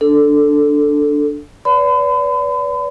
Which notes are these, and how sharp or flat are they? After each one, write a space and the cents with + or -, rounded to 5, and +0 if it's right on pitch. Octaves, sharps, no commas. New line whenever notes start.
D4 +0 A4 +5
B4 +0 D5 -40 B5 +40